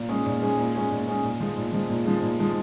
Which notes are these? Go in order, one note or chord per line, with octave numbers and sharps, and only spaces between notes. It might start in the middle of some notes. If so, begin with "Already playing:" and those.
Already playing: A#2
G#3 C#4 G#4
A#2
G#3 C#4 G#4
A#2
G#3 C#4 G#4
A#2
G#3 C#4 G#4
A#2
F3 G#3
A#2
F3 G#3
A#2
F3 G#3
A#2
F3 G#3